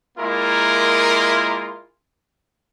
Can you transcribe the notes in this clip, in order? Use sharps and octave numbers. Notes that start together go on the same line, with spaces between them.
G#3 A#3 E4 F4 A#4